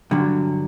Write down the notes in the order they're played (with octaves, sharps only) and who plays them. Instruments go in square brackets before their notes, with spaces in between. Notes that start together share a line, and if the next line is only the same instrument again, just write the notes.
[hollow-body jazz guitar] G2 D3 F#3